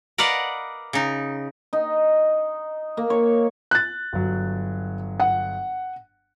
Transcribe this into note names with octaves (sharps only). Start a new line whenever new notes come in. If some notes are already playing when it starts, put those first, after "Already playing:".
A#4 B4 D5 D#5 F5 F#5
C#3 D#4
D#4
A#3
C#5
F#6 A6
G1 F#3
F#5